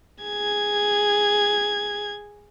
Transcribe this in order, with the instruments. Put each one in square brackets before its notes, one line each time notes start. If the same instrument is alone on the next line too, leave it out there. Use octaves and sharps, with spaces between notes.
[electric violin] G#4 G#6